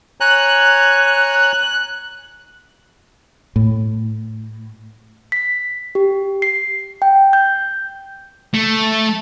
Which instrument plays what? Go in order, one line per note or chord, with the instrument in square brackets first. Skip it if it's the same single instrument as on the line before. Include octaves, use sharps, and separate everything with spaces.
[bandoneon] C#5 G#5 A#5 [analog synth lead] F#6
[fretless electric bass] A2
[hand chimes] B6
G4
C7
G5
G6
[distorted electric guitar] A3